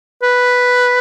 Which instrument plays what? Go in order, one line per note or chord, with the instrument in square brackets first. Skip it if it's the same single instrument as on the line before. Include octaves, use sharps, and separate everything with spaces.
[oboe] B4